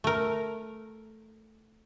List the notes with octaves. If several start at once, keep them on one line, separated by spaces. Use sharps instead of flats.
A3 A#4